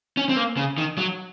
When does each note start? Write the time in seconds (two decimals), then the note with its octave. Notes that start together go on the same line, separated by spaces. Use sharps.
0.17 C#4
0.29 C4
0.36 A#3
0.57 C#3
0.78 D#3
0.98 F#3